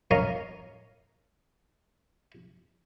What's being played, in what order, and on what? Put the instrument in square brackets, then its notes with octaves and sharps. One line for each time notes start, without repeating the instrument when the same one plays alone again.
[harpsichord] C#4 A#4 D#5 F5